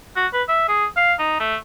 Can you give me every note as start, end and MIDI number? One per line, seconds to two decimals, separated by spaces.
0.16 0.27 66
0.33 0.43 71
0.48 0.64 76
0.69 0.85 68
0.97 1.14 77
1.19 1.35 63
1.40 1.56 57